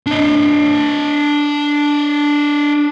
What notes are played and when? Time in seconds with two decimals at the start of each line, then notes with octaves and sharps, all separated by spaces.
0.07 D4 D#5